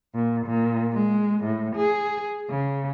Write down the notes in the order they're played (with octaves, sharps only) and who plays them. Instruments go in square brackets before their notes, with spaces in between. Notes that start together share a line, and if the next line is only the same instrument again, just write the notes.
[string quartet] A#2
A#2
G#3
A2
G#4
C#3